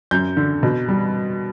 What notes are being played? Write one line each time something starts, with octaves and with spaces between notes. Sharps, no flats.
F#2 G6
D3
B2
G3